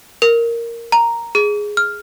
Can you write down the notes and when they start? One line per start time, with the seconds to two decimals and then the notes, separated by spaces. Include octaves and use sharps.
0.22 A#4
0.92 A#5
1.35 G#4
1.77 F6